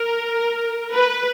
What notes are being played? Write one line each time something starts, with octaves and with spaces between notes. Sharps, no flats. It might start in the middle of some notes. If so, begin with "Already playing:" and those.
Already playing: A#4
B4